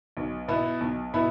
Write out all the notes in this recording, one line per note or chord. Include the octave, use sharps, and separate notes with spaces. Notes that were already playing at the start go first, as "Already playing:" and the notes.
B1
B2 B3 E4
B1
B2 B3 E4